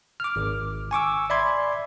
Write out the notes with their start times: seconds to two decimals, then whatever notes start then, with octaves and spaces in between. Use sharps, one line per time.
0.20 D6 F6
0.36 G#1
0.91 G#5 C#6 D6 E6
1.30 D5 E5 B5 C6 G#6